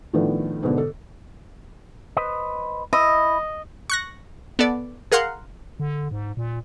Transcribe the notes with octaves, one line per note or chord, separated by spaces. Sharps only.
A2 D#3 F3 A3 B3 D4
G#2 B2 D3
A4
B4 C5 D#5
E4 D#5
C#6 F#6 A#6
B3 A4 D5
G#4 A#4 F5 F#5 C6
D3
G#2
A#2